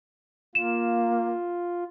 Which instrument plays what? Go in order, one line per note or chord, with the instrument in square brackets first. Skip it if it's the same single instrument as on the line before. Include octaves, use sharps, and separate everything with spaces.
[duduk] A#3 [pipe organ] F4 [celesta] E7